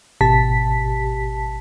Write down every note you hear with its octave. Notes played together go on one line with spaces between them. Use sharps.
G#1 B2 G4 A5 B6